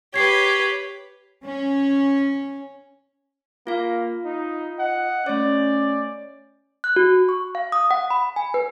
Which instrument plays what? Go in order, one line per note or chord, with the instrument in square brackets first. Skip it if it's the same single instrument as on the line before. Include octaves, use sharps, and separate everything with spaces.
[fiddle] G4 B4 [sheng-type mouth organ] C#5 [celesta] G#6 C7
[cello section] C#4
[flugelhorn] A#3 [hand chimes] F4 F5
[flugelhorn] D#4
[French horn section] D#5 [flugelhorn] F#5
[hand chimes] A3 C#5 [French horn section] C#4 [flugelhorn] D5
[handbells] F#6
F#4
C#6
F5
D#6
F#5
B5
G#5
B4